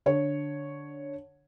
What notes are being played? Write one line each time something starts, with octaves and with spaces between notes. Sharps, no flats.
D3 C#5